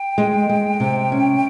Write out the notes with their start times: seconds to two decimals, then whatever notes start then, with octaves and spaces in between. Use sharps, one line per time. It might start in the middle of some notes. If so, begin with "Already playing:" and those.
Already playing: G5
0.18 G#3
0.49 G#3
0.80 C3
1.12 C#4